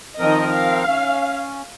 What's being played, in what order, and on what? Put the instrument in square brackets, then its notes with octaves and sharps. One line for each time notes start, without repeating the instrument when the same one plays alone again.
[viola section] D#3 D#5 [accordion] F3 C4 A#4
[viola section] F5
[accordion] C#4